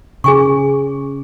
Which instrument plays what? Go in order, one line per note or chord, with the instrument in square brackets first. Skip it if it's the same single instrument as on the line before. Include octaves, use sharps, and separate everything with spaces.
[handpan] C#3 [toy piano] G#4 G#5 C#6